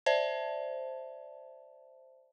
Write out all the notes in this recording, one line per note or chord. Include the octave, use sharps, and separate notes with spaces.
C5 D5 E5 A5